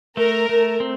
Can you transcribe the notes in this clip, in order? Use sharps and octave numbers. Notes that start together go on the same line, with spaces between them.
A3 A#4
A3
C4